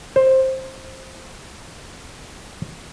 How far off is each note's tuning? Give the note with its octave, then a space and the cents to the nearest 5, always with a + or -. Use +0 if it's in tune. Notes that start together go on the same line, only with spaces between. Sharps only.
C5 +10